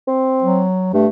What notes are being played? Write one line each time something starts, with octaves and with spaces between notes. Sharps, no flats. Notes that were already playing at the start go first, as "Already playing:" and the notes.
C4
F#3
G2 A3